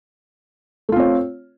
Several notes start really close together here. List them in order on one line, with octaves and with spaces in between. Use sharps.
A3 F4 C4 C#5